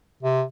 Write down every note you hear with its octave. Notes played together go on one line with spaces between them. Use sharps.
C3